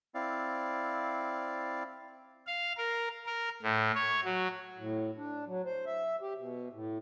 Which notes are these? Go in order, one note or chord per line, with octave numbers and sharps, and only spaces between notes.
C4 E4 D5 F5
F5
A#4
A#4
A2
C#5
F#3
A2
D4
F#3
C5
E5
G4
B2
A2